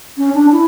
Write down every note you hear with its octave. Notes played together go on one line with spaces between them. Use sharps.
C#4
D4
E4